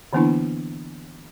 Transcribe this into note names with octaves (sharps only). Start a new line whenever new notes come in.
D3 E3 A#3 B3 D4 E4